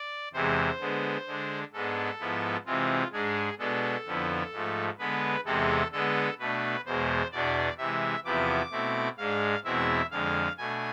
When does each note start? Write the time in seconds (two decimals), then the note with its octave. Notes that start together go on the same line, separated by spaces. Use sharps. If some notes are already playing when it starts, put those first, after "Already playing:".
Already playing: D5
0.34 E2 C3 E3 G#3 C5
0.80 D3 G#3 B3
1.27 D3 G#3 D4
1.73 G#2 G#3 B3 D4 A4
2.19 G#2 F3 B3 E4
2.66 C3 E3 G#3 C4 F4
3.12 G#2 G#3 D4 G#4
3.59 B2 G#3 B3 D4 A4
4.06 F2 D3 F3 B3 E4
4.52 G#2 F3 A3
4.98 D3 G#3 B3 B4
5.46 E2 C3 G#3 C4 A4
5.92 D3 G#3 B3 A4
6.39 B2 A3 D4 B4
6.86 E2 B2 G#3 C5
7.32 E2 B2 B3 D4 D5
7.78 C3 E3 G#3 E5
8.25 E2 C3 F3 B3 E4 D6
8.71 B2 A3 C4 E4
9.18 G#2 G#3 D4 F5
9.64 E2 B2 G#3 C4 E4 E5
10.11 F2 D3 G#3 F5
10.57 B2 A3 D4 G#5